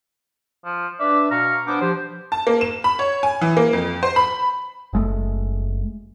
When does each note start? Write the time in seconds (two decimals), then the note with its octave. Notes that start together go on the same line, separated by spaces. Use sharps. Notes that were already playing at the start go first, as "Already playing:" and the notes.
0.65 F3
1.00 D4 B4 D5 E5
1.31 B2 F5 A#5 C#6
1.67 B3 D4 C5 D6
1.81 F3 G4 C5
2.32 A5
2.47 A#3
2.61 E7
2.84 B5
2.99 C#5
3.23 G#5
3.41 E3
3.57 A#3
3.73 F2
4.03 C5
4.16 B5
4.93 F#1 G#3 A3